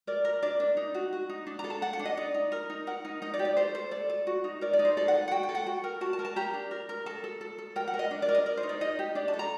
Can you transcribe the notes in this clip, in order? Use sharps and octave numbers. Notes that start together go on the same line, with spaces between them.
A#4 D5
A#4
D4 D5
D4
D#4
F#4
F#4
D#4
D4
A#5
A4
A5
A4 F#5
F#5
D4
D#5
D#4 D5
D#4
A#4
D#4
A#4 F#5
D#4
D#4 D#5
D5
G4
D5
A4 C5
A4 C5
A4 D5
A4
F#4
D#4
A#4 D5
D5
D#4
C5
A4 D5
F#5
A4
F#5
F#4 G5
G5
A4
F#5
F#4 G5
A#4
F#4 A5
A5
A#4
A5
G4 A#5
D4
A#4
A#4
A4 A5
A4
A4
A4
A#4 G5
F#5
A#4
D#5
D4
D5
A#4
D#5
A#4 D5
C5
D#4
D5
D#4 D#5
G4
D4 D5
A5
A4
A#5